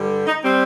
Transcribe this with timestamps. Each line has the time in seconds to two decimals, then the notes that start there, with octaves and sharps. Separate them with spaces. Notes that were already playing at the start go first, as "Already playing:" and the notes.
Already playing: G2 D3 G3
0.26 D#4
0.44 G3 C4